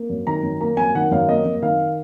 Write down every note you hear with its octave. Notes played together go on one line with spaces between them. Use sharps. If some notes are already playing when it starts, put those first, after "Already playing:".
Already playing: A#3
F#2
D#3 A#5
F#2
A#3 A#5
F#2 G#5
D#3 F#5
F#2 F5
A#3 D#5
F#2
D#3 F5